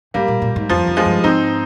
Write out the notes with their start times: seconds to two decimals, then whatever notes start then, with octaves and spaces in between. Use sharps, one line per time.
0.14 G#2 G3 A#3
0.28 A#2
0.42 A#2
0.56 G#2
0.69 F2 F3
0.87 F2
0.97 F3 G#3
1.06 G2
1.24 G#2 C4 D#4